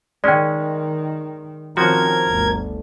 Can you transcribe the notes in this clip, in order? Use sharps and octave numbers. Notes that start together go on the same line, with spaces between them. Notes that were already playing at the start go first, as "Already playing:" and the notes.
D#3 G#3 C#4 D5 G5
D#3 F3 C4 C#4 F#4 A#4 G#6
G1 D2